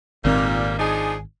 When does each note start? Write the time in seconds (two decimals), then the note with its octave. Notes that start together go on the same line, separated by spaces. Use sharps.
0.25 G#1 F2 A#2 D#3 G3 A#3 C4
0.79 F3 D4 D#4 G#4